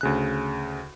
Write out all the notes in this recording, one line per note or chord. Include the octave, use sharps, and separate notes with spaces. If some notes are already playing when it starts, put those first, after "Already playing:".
D2 C#3 F#6